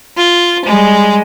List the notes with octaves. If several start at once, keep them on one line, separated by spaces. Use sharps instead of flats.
F4
G3 G#3